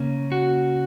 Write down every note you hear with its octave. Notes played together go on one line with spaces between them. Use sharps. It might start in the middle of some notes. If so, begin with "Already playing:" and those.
Already playing: C#3 A#3 C#4
F#4